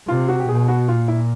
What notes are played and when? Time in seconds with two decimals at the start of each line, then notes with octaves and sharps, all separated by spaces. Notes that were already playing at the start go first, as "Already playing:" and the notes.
0.08 C3 F4
0.28 F#4
0.40 G4
0.49 B2 G#4
0.68 F#4
0.88 A#2 F4
1.08 E4